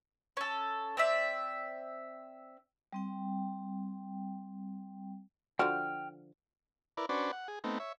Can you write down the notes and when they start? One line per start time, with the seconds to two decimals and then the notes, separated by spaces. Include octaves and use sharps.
0.37 C#4 A4
0.97 C4 D5 E5
2.93 G3 C4 G5
5.59 D3 F3 F#4 G5 F6
6.97 E4 A#4 B4 D5
7.09 C#4 D4 F#4 B4 C5 D5
7.33 F#5
7.48 G#4
7.64 A3 B3 C4 D#4
7.80 C#5 E5